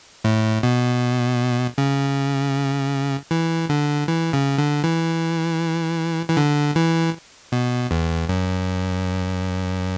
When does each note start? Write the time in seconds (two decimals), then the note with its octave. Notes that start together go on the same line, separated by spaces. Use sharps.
0.24 A2
0.63 B2
1.78 C#3
3.31 E3
3.69 D3
4.08 E3
4.33 C#3
4.58 D3
4.84 E3
6.28 E3
6.37 D3
6.76 E3
7.52 B2
7.91 E2
8.29 F#2